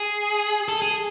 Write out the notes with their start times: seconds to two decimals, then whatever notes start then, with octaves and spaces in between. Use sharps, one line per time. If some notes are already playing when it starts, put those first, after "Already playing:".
Already playing: G#4
0.68 A4
0.82 G#4